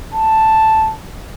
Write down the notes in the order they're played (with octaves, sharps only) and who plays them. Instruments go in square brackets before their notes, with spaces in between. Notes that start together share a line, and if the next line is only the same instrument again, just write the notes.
[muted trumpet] A5